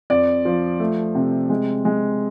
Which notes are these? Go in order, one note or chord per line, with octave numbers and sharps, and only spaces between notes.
F2 D5
F3
A3
C3
G#3
G#3